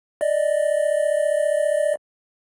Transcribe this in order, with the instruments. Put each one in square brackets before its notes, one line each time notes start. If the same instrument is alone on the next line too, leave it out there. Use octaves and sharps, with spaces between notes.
[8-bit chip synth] D5 D#5